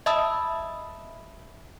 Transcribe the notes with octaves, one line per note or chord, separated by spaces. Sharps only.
D#5 E5 A5 B5 D#6 E6